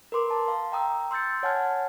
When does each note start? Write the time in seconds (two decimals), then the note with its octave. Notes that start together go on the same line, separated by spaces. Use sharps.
0.12 A#4 B4 C6 D6
0.30 A5
0.47 F5 C6
0.72 G5 A#5 D#6 E6
1.11 C6 E6 G6 A6 C#7
1.43 C#5 F#5 G#5 A5 F6 G#6